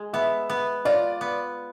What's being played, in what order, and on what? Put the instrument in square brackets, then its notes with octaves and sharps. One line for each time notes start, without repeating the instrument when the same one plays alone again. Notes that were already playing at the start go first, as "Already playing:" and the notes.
Already playing: [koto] G#3
[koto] B3 [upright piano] E5
[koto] B3
[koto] F4 [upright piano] D5
[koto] B3